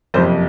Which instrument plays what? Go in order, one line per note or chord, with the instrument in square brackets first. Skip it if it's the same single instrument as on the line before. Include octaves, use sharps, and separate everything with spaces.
[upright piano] F#1 F2 C3 F3 C5